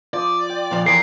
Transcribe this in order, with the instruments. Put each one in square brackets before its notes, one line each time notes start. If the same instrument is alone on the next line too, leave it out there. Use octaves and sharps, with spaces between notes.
[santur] F3 D6 D#6 [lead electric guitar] D5
[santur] G5
[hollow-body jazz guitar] A#2 F3
[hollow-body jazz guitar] F2 E3 D5 [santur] G#4 C6 [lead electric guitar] A#4 [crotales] C7